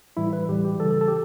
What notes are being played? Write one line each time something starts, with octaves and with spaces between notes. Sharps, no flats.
A2 E3 G3 E4
B4
A2 E3 G3 G4
G4
C#3 E3 G3 A4
A4
A4
G4